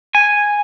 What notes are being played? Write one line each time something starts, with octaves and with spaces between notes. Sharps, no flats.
G#5